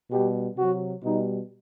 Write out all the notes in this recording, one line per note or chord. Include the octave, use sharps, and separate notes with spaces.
B2 G3 G4
C3 F#3 F#4
B2 G3 D#4